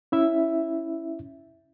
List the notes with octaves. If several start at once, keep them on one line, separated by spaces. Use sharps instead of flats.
C#4 E4 E5